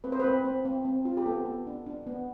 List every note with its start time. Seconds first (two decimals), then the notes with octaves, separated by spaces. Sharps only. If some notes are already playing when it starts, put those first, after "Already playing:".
0.04 C4 B4
0.12 C5
0.20 C4 B4
0.45 C4
0.65 C4
0.85 C4
1.05 F4
1.17 G4
1.26 B3 A4
1.45 B3
1.67 D4
1.86 D4
2.07 B3